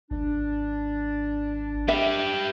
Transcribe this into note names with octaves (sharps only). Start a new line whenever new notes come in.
G#1 D4
G4 B4 E5